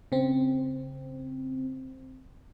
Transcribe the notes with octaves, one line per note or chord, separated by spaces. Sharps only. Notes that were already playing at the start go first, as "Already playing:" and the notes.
C#3 C4